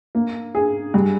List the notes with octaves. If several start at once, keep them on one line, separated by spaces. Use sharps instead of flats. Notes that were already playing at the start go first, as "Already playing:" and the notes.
A#3
G#4
G2